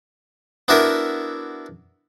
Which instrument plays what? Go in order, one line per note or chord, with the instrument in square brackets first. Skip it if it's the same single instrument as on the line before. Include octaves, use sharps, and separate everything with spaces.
[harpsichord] B3 D4 E4 F#4 A#4 E5